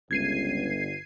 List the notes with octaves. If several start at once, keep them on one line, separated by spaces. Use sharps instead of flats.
G1 C#2 G#6 C7 D#7